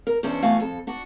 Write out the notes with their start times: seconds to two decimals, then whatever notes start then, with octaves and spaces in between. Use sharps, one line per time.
0.07 A#4
0.23 E2 G2 C#4 D4 C5
0.42 E2 A3 F#4 F5 G#5
0.60 F2 A4
0.87 D4 F#4